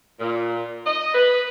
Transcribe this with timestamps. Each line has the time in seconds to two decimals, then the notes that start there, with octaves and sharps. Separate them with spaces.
0.20 A#2
0.86 D#5
1.14 B4